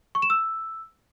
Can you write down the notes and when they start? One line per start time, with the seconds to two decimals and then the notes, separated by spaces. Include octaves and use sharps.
0.15 C#6
0.22 E7
0.30 E6